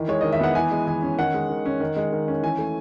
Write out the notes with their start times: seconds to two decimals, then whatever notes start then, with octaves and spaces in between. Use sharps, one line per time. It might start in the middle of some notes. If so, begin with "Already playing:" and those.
Already playing: D#3 E3
0.08 G#3 C#5
0.21 D#3 D#5
0.32 E5
0.40 B3 F#5
0.55 E3 G#5
0.71 G#3
0.87 E3 G#5
1.02 C#4
1.18 D#3 F#5
1.34 G#3
1.50 D#3
1.65 C#4
1.80 D#3
1.96 G#3
2.12 D#3
2.28 C#4
2.42 E3 G#5
2.59 A3